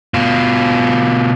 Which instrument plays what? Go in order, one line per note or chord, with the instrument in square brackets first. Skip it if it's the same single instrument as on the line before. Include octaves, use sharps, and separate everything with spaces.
[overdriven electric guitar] B2 F4